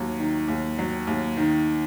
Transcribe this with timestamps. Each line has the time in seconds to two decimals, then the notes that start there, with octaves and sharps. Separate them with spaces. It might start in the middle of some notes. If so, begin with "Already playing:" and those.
Already playing: D#2 F#3
0.19 D#3
0.48 D#2
0.79 F#3
1.07 D#2
1.37 D#3